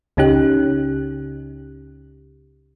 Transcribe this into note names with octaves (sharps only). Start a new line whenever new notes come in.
C#2 C#3 C#4 D#4 G4 F#6